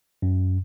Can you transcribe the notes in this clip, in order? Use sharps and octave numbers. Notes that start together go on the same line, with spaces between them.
F#2